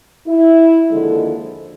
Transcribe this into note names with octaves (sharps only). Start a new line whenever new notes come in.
E4
D#2 D3 F3 G#3 A4